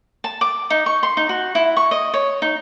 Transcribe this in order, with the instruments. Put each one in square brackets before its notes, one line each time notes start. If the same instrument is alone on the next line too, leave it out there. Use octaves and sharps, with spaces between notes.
[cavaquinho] A5
D6
D#4
C#6
C6
D#4
F#4
E4
C#6
D#5
C#5
D#4